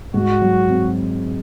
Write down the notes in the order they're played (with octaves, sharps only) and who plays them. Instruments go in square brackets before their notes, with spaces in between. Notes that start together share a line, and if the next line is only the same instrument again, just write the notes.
[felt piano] G#2 [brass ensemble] F#4
[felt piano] F#3
C4